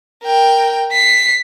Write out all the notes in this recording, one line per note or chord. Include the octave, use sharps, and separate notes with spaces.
A#4 G5
B6 C7